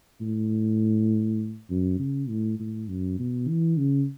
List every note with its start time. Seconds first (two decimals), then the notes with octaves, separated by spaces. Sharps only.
0.21 A2
1.70 F#2
1.99 C#3
2.29 A2
2.60 A2
2.89 F#2
3.19 B2
3.49 E3
3.78 C#3